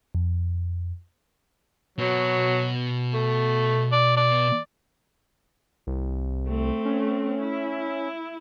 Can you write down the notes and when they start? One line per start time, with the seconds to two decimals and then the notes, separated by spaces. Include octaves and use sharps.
0.15 F2
1.98 B2 F#3
3.14 A3
3.92 D5
4.17 D5
5.87 C2
6.48 A3 C4
6.85 C#4
7.41 E4